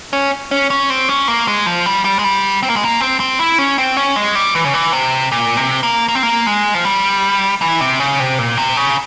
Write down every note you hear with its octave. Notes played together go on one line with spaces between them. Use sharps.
C#4
C#4
C#4
C4
C#4
A#3
G#3
F3
G3
G3
G#3
G3
C4
A#3
G#3
A#3
C4
C4
E4
C#4
C4
C#4
G#3
G3
E3
C#3
E3
C3
A#2
C3
A#3
A#3
C4
A#3
G#3
F3
G3
E3
C3
C#3
C3
A#2
C3
C#3